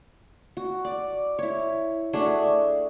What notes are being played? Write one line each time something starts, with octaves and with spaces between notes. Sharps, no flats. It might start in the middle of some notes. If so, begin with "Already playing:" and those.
F#4
D5
E4 C#5
A3 D4 F#4 G#4